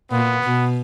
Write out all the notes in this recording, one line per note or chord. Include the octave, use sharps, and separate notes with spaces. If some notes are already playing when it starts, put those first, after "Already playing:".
A#2 B3
B2